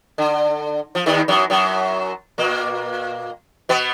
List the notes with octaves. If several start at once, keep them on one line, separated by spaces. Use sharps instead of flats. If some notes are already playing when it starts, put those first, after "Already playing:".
D3
F3
D#2 D#3
F#2 F#3
F#2 F#3
A#2 A#3
B2 B3